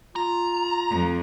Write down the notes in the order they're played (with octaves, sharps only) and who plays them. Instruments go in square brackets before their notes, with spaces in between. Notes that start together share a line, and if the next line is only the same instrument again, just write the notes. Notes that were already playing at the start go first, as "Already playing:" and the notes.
[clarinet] F4 [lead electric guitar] A#5
[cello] F2